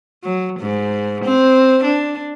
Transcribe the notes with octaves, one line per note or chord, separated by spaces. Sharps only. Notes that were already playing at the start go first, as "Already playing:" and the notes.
F#3
G#2
C4
D4